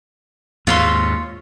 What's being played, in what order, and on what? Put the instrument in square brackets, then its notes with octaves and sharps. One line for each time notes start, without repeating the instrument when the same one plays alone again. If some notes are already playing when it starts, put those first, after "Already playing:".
[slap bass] D#2 G#2 [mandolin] F4 C#5 C6